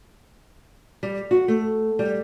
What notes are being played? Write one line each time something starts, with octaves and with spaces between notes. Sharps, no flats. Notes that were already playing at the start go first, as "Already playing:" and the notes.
G3
F#4
A3
G3